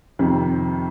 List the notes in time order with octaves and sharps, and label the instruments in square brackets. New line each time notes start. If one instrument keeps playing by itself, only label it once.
[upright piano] F2 C3 D#3